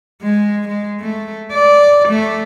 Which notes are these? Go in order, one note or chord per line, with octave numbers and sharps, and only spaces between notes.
G#3
G#3
A3
D5
A3